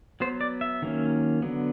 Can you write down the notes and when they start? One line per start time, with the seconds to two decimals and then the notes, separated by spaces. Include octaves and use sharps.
0.20 F#3 B3 C5
0.41 D5
0.61 E5
0.82 D#3 F#3 A#3 C#4
1.42 D3 F#3 B3